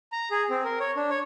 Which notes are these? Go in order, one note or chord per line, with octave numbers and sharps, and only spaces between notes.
A#5
G#4
C4
A#4
C#5
D4
C#5